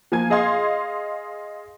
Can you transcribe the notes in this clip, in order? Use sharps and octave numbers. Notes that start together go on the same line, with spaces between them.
F3 A#3 G#5 G#6
G#4 D#5 F5 C6 G#6